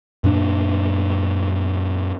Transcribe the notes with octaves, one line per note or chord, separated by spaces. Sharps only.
F#2 A#2 D4